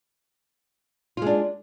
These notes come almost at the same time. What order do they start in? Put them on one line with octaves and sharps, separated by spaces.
F4 G#3 D4